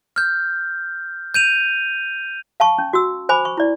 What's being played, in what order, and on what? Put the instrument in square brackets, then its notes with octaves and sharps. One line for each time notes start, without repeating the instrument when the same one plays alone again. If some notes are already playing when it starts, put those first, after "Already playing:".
[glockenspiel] F6 G6
G6 D#7 F7
[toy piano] F5 A5 C#6
C#4
F#4 E6
C5 G#5 B5 D6
C#6
E4 D5